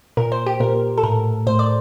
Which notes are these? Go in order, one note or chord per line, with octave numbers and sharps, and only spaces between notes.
A#2 A#4
C5
G4
A#2 A#4
A4
A2 A#4
A2 C5
D5